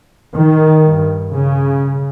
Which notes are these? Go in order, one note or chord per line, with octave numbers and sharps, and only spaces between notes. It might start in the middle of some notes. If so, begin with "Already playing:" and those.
D#3
G2
C#3